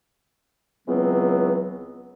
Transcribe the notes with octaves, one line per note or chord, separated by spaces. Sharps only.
C#2 E3 F#3 B3 C4